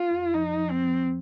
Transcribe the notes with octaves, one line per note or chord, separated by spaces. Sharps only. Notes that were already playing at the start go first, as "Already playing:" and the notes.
Already playing: F4
F2
F3 D#4
F3
C4
F3